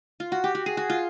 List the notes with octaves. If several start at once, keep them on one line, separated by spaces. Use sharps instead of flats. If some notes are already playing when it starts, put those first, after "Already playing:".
F4
F#4
G4
F#4
G#4
F#4
F4